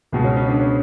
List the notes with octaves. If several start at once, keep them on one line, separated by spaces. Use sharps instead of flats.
C#2 B2 G#3
C#4
C#4
D4
C#4